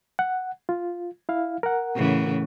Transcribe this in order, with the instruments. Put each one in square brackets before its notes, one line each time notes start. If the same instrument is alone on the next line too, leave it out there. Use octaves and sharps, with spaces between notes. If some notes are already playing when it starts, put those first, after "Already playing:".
[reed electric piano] F#5
F4
E4 F5
A#4 F#5
[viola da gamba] A2 C#3 E3